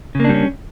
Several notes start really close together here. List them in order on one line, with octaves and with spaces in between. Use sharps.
C#3 A#3 D4 G3 C#4